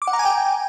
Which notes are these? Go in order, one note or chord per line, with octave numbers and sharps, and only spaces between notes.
D6
F#5
A#5
G#5
G5